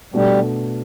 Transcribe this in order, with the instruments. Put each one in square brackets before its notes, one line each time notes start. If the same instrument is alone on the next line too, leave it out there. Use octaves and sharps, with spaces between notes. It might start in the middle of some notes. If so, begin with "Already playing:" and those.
[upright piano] B2 A3 D4 A4 [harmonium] G3